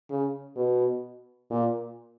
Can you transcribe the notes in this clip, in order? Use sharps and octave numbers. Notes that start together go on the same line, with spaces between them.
C#3
B2
A#2